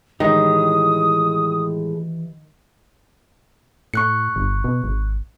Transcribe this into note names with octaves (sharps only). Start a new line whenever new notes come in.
A2 D#3 E3 G#3 G4 D#6
A2 C#6 F#6 C#7
G1
B2
G#1